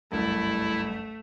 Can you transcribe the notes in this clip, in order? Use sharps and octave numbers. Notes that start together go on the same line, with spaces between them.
F#1 C2 G2 A3 E4